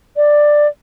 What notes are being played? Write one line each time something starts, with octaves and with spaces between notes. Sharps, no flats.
D5